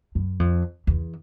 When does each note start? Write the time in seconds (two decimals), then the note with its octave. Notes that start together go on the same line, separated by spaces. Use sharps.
0.15 F#2
0.40 F2
0.87 E2